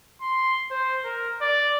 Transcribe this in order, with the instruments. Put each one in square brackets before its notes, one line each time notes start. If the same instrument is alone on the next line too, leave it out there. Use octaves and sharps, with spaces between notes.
[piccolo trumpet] C6
C5
A#4
D5